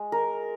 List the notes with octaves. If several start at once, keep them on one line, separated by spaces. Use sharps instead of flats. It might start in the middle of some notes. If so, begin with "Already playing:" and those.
Already playing: G#3
A#4